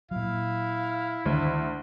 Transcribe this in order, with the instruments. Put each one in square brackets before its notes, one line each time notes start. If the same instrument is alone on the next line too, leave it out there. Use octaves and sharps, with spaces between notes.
[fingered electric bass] A#2 F#3 [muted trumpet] E4 [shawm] F5
[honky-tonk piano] D2 [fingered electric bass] D#3 G#3